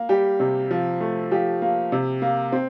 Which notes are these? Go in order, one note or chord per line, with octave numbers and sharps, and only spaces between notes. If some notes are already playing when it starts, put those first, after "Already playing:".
Already playing: A#3
G3 G4
C3
F3
A3
F3 G4
A#3
C3
A#3
C4